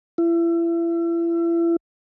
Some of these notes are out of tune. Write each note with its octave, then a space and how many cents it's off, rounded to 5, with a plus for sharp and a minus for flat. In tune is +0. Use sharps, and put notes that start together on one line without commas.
E4 +35